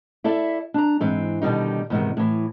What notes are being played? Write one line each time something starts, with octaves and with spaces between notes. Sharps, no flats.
E4 A4 D5 E5
D4 A#5
G#2 E3 C4
B2 D3 D#3 G3 D#4
E2 G#2 C3 D#3
A2 E3